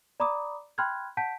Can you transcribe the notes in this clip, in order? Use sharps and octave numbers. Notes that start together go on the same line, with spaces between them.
D5 A#5 B5 D6 D#6
G5 B5 C6 F6 F#6 G#6
F#5 A5 G6 B6 D7